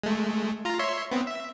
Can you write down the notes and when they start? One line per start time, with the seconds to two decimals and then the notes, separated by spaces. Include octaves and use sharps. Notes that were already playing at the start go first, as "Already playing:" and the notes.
0.03 G#3 A3
0.65 F4 A#5
0.79 C#5 E5 C6
1.11 B3 C4
1.26 E5